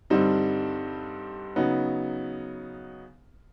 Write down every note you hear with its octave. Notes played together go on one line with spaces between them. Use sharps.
G2 D3 G3 C4 D#4
C#3 F#3 B3 D#4